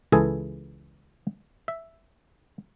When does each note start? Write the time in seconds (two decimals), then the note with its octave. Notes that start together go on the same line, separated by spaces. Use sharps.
0.12 C#2 E3 G#4 A4 G#5
1.68 E5